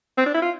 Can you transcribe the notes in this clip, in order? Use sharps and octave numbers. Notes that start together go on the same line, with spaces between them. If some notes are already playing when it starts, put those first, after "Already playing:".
C4
D4
E4
F4